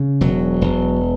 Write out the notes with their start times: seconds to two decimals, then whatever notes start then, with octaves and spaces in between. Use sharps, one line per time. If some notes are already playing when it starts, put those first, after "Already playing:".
Already playing: C#3
0.21 E1 F#3
0.61 E1